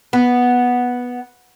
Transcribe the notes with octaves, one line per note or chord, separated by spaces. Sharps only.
B3